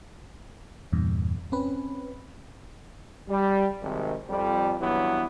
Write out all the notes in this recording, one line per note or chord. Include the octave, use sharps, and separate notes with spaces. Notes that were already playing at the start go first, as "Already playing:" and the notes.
E2 G2 A#2
C4 C#4 B4
G3
G#1 C3 D#3
F2 G3
G2 E3 F#3 B3